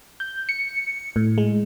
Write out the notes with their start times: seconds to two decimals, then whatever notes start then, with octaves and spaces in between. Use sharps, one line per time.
0.20 G6
0.49 C#7
1.16 A2
1.38 G#3